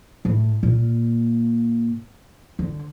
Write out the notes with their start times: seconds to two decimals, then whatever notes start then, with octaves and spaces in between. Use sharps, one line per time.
0.25 A2
0.63 A#2
2.59 D3